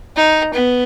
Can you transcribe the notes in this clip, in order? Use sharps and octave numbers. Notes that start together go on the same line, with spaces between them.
D#4
B3